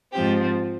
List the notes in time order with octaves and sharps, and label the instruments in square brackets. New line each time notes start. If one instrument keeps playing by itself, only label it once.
[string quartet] G#2 F3 C4 G4